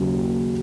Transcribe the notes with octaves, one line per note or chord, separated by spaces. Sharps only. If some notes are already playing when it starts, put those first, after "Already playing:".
Already playing: D#2 C#3 F#3